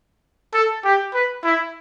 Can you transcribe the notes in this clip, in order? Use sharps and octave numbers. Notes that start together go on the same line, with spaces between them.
A4
G4
B4
E4